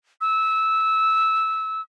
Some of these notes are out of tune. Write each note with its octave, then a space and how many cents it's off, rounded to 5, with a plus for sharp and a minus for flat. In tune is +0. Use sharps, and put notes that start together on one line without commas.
E6 -15